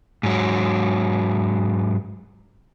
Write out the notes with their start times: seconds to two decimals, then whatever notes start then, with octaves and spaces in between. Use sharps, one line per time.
0.23 G#2 F#3